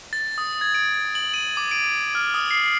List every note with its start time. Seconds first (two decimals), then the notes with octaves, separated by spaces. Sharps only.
0.13 A6
0.38 D#6
0.61 G#6
0.74 D7
1.15 F#7
1.34 D#7
1.57 D6
1.71 D7
2.15 F6
2.34 D#6
2.51 C7